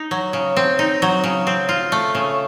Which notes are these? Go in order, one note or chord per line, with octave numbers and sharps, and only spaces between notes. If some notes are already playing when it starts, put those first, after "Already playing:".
Already playing: D#4
F#3
C#3
C4
D#4
F#3
C#3
C4
F4
A3
C#3